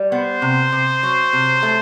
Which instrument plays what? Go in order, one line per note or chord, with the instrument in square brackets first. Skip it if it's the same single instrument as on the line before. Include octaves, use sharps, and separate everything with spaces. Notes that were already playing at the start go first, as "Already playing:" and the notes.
Already playing: [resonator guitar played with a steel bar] G3
[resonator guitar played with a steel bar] B3 [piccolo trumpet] C5
[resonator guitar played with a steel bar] C3
C3
F#3
C3
A3